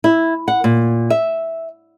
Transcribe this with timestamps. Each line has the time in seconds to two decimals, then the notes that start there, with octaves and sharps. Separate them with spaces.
0.04 E4
0.48 F#5
0.64 A#2
1.10 E5